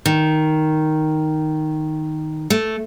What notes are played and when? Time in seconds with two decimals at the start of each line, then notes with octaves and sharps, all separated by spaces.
0.06 D#3
2.50 A3